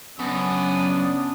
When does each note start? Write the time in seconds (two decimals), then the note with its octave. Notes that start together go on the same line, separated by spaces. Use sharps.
0.19 F#2 C#3 B3 C#4 D4 D#6